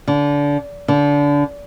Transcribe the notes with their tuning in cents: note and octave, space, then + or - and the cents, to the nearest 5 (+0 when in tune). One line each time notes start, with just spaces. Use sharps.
D3 -25
D3 -25